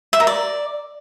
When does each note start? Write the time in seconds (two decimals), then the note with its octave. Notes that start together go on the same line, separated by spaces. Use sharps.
0.13 E5
0.20 A#4
0.27 D5